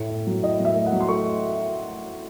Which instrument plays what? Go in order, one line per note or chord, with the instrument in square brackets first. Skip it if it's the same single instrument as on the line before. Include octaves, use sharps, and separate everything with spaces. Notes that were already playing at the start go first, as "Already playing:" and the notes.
Already playing: [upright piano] A2 A3
A2
F#3
A2 D#5
F#3
E5
A3
F#5
F#3
C6
A3 C#6